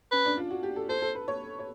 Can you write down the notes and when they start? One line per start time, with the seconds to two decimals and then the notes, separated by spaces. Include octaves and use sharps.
0.12 C#4 B4
0.25 D4
0.37 F4
0.51 F#4
0.63 G4
0.76 A4
0.89 A4 C5
1.02 A4
1.15 B4
1.28 C#5
1.59 C#5